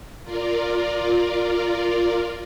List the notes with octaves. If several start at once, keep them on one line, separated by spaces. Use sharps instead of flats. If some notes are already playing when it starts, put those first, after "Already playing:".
F4 A#4 D5